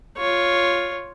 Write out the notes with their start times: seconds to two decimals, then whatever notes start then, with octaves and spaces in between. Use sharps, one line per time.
0.17 F4 C#5